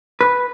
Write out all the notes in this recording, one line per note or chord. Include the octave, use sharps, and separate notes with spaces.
B4